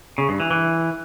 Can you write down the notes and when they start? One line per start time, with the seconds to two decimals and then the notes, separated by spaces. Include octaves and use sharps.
0.18 C#3
0.29 G2
0.40 E3
0.51 E3